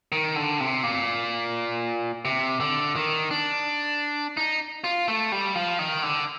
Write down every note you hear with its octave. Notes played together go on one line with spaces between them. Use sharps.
D#3
D3
C3
A#2
C3
D3
D#3
D4
D#4
F4
A3
G3
F3
D#3
D3